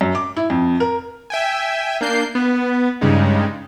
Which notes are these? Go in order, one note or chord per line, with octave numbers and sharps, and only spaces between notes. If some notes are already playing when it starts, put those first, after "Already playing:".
F#2
D6
E4
F2
A#4
E5 G5 G#5
A#3 D4 G6 C7
B3
G2 C#3 G3 G#3 D#4